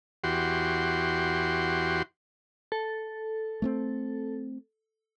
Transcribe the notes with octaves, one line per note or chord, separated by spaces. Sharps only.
E2 F#4 G4 C6
A4
A3 B3 C4